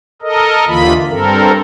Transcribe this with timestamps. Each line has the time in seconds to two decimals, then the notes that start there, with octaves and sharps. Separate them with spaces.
0.22 A4 A#4 D#5
0.68 D#2 D3 E3 A#3 F4 B5
1.09 G2 C4 A4 A#4